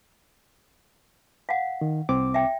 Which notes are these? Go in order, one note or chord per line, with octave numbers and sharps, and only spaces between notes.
F5 F#5
D#3
C2 C4 D6
E5 G5